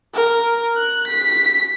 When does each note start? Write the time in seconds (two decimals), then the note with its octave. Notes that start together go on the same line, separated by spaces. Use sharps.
0.14 A#4
0.77 F#6
1.07 B6